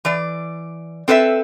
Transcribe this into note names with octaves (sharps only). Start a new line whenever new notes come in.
E3 D5
C4 A4 B4 D#5 E5